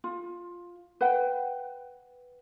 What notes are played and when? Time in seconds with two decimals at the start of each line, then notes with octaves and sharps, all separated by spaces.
0.04 F4
1.01 B4 F#5 G5